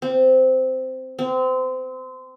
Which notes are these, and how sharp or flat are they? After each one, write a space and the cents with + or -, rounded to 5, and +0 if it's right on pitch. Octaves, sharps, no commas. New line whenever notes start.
C4 -10
C4 -25